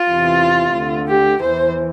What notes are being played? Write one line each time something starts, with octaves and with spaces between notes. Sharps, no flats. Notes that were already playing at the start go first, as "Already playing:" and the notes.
Already playing: F4
E2 C3 E3
D2 D3
G4
E2 E3 C5